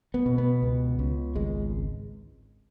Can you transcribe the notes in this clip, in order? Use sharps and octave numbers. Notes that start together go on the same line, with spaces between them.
B3
B2
B3
C#2
C#2
G#1 G#3